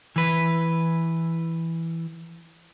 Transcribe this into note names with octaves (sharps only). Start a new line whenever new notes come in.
E3 B4